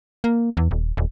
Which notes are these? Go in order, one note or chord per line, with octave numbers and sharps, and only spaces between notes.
A#3
E2
D#1
D#1